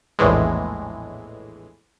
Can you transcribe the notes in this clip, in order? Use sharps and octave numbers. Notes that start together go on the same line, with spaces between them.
A#1 E2 A2 E3 G#3